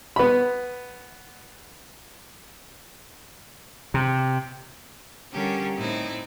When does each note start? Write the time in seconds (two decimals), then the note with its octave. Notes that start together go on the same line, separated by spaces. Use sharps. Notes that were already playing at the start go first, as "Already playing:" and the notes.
0.16 B3 B5
3.94 C3
5.33 D3 G3 C#4 G4 A#4
5.77 A2 C4 D#4 E4